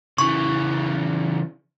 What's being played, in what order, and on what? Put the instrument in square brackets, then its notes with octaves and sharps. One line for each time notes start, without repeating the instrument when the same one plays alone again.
[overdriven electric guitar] C#3 E3 [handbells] C#6